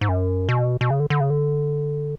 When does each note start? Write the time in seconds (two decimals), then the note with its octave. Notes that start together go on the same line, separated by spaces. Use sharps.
0.01 G#2
0.09 F#2
0.49 B2
0.81 B2
0.90 C#3
1.00 D3
1.10 D3
1.20 C#3
1.30 D3